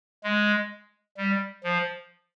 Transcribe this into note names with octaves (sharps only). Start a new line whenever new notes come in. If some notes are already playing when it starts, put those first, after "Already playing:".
G#3
G3
F3